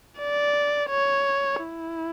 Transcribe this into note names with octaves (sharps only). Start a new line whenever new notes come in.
D5
C#5
E4